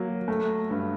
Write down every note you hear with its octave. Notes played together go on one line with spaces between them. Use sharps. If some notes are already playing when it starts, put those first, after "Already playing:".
Already playing: F#3 A#3
A3
G2